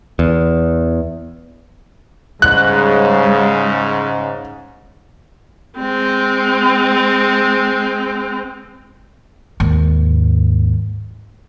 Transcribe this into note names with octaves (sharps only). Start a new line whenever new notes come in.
E2
G#2 C#3 G3 G#3 F#6
G#3 C4
D#2 G#2